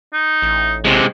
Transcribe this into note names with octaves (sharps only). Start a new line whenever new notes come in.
D#4
A1
C3 G#3